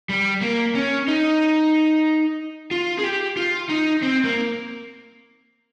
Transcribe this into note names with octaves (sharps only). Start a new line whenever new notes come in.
G3
A#3
C#4
D#4
F4
G#4
G4
F4
D#4
C4
A#3